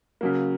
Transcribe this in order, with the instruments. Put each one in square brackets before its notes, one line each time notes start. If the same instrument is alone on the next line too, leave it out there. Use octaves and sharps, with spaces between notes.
[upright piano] C#3 F#3 A#3